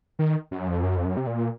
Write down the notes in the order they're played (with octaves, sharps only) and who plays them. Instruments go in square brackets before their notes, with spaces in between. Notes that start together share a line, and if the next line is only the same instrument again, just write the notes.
[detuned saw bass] D#3
F#2
F2
F#2
F2
F#2
C3
A#2